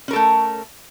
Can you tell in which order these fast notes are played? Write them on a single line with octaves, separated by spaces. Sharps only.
C#4 A#4 A4 A3